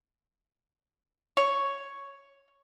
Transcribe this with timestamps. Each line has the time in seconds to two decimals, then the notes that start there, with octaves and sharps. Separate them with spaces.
1.37 C#5